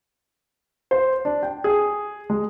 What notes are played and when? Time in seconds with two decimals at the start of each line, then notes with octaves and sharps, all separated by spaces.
0.91 C5
1.25 D4
1.43 G5
1.64 G#4
2.30 G#3